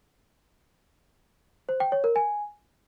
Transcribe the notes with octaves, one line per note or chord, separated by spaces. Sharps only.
C5
G5
C#5
A#4
G#5